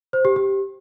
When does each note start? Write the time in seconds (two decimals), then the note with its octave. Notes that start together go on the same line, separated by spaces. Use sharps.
0.13 C5
0.25 G4
0.36 G4